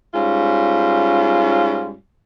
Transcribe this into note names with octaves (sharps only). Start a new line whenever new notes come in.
G#2 G3 C#4 F4